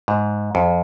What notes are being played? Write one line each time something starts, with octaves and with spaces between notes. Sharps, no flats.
G#2
F2